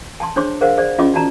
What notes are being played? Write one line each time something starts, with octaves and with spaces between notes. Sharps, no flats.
G#5 A5 C6
D4 G#4 C5 C#5 C6 D6
G#4 A#4 C5 F5 F#5
G#4 C5 D5
C#4 F4 G#4 D#5 C6 D6
D#4 F#4 D5 A5 A#5